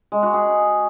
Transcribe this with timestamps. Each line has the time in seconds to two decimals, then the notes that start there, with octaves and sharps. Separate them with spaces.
0.12 G#3
0.23 F#4
0.34 G#4